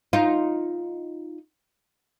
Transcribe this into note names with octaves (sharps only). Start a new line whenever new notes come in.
D#4 F4